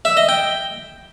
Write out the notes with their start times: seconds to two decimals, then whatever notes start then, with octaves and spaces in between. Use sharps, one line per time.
0.05 E5
0.17 D#5
0.29 G5